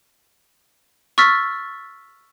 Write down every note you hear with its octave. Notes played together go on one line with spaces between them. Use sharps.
C#6 E6 F6 A6 B6